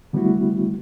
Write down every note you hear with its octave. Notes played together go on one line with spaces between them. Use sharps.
D3 G3 A3 B3 E4 F#4